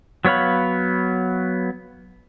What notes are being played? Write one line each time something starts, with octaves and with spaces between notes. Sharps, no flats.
F#3 B3 C#5 F5 B5